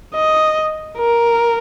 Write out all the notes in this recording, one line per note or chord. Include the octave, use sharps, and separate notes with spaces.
D#5
A#4